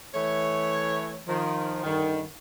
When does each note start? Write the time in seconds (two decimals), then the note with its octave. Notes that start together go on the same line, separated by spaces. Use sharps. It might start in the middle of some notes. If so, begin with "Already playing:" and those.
0.14 E3 A3 C#5
1.28 D#3 F3
1.83 G2 D3 D#3